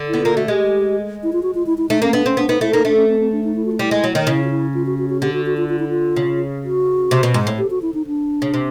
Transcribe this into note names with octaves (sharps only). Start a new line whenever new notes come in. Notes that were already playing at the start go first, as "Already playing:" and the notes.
Already playing: D3
B3 E4
A#3 F4
A3 F#4
G#3 G4
E4
F4
F#4
F4
E4
E4
A3 D#4
A#3 C#4
B3 D4
C4 C#4
B3 D4
B3 D#4
A3 E4
A#3 D#4
A3 D4
C#4
C4
C4
D4
D#4
E4
F#4
F4
G3 E4
G#3
F#3
D#3
C#3 E4
F4
E4
F4
F#4
F#4
F#4
D3 G4
F#4
F#4
F4
F4
E4
F4
C#3
F#4
C3
B2
G#2
A2
G4
F#4
E4
D#4
D4
C#3
C3